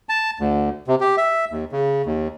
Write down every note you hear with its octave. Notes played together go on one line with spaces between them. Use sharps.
A5
D2
C3
G4
E5
D#2
C#3
D#2